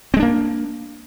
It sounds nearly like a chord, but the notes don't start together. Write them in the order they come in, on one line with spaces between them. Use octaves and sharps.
C4 G#3 D4 A#3